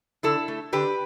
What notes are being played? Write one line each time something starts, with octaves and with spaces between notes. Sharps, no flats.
D3 E4 A4
A3
D3 G4 B4